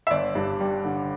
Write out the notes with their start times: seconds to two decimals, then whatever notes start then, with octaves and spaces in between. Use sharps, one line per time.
0.07 E5
0.11 G1 D5
0.35 G2
0.60 G3
0.85 D3